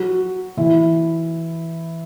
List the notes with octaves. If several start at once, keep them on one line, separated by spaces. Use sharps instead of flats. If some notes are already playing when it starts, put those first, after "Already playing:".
Already playing: F#3 F#4
E3 E4